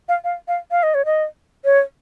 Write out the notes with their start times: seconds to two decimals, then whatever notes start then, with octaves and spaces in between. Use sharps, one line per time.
0.09 F5
0.24 F5
0.48 F5
0.71 F5
0.83 D#5
0.94 C#5
1.05 D#5
1.65 C#5